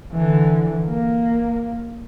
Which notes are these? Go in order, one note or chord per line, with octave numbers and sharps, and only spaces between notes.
D3 E3
A#3